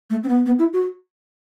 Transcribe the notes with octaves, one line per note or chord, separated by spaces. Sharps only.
A3
C4
B3
B3
E4
F#4